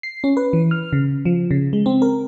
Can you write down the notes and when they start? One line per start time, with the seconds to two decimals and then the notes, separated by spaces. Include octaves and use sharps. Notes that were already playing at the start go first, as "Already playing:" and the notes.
0.03 C7
0.24 C#4
0.37 B4
0.53 E3
0.71 F6
0.93 C#3
1.25 F3
1.51 C#3
1.73 G#3
1.86 C4
2.02 A#4